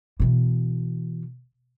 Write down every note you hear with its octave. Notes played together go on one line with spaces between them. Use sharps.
B2 E3